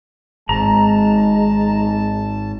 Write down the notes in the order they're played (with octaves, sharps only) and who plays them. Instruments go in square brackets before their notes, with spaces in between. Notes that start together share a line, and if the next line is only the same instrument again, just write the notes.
[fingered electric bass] G#1 G#2 [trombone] G#3 [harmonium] A5 [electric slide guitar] A#5